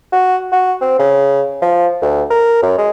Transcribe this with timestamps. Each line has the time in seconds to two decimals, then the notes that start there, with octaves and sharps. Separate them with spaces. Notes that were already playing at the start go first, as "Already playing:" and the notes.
0.12 F#4
0.52 F#4
0.81 C4
0.99 C#3
1.62 F3
2.02 D2
2.30 A#4
2.62 F#2
2.78 G#3